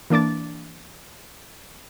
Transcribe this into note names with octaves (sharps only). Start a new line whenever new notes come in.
E3 A#3 D4 D6 A6